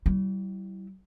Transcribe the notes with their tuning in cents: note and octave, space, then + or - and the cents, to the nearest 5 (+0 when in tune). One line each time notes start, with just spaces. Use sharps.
G3 -40 E4 +0